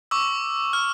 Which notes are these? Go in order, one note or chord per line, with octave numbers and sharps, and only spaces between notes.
C#6 D6 E6
F6